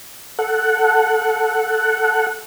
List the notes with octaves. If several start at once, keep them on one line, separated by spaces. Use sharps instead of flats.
A4 F#5